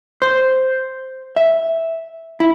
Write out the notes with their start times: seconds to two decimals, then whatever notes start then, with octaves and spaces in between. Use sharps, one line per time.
0.22 C5
1.36 E5
2.40 E4